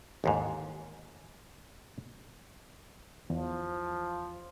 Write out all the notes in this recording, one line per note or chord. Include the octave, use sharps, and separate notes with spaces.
A1 D#2 G#2
E2 F3